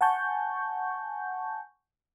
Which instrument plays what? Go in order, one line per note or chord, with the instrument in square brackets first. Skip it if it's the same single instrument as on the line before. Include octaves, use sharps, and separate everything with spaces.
[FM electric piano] F#5 G#5 A5 C#6 G6